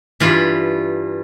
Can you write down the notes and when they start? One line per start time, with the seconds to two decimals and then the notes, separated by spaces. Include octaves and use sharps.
0.20 G2 E3 F4